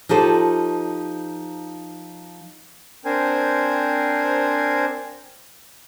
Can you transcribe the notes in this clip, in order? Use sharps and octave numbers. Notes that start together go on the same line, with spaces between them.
F3 D#4 G4 A4 C5
C4 D4 A#4 C5 G#5